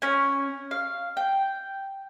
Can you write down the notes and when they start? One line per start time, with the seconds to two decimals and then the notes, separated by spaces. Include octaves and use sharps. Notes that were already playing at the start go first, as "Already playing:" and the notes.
0.02 C#4 G#5
0.71 F5
1.17 G5